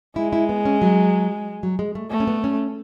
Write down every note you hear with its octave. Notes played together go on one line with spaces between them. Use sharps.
G#3 E4
E4
B3
C#4
F#3
F#3
G#3
A3
A3 B3
C#4
B3
C#4